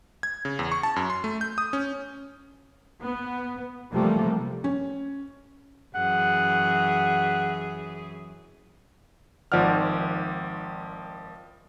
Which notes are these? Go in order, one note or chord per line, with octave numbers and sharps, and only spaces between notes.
G#6
C#3
E2
C#6
A5
F#2
C6
A3
G6
D#6
C#4
B3
C3 E3 F3 G3 A3 A#3
C#4
F#2 E3 G#4 F#5
G#1 D#3 F3 D5 F#5 F6